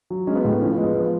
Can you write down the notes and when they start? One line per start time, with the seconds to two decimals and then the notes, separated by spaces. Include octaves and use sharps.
0.10 F#3
0.27 G#3 C#4
0.35 B3
0.44 A2 G#3
0.53 B3
0.61 F3 C#4
0.72 B3
0.78 G#3
0.84 B3
0.95 F3 B3